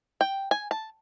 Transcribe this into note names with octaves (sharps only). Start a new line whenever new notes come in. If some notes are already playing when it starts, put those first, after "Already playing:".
G5
G#5
A5